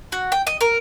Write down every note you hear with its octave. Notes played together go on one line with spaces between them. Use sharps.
F#4
G5
D#5
A#4